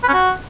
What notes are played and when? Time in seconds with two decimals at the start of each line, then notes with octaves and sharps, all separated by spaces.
0.03 B4
0.08 C#4
0.14 F#4